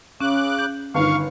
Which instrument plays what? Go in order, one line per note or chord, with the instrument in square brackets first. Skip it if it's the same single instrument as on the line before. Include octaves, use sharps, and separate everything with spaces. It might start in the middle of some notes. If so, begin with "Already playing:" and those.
[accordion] C#3 D6 F#6 [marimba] C#4
[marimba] G6
[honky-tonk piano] G1 D#3 [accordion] F5 [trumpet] C#6